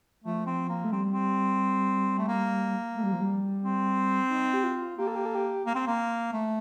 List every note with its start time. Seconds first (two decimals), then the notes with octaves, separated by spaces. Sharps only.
0.24 F3 A3
0.47 C4
0.69 A#3
0.84 A3
0.92 G3 C4
1.12 C4
2.19 A3
2.28 A#3
2.95 A3
3.03 G3
3.13 F3
3.21 G3
3.63 C4
4.30 D#4
4.54 G4
4.64 F4
4.98 A#3 G4
5.07 A4
5.16 G4
5.25 A4
5.35 G4
5.66 A#3
5.75 C4
5.87 A#3
6.33 A3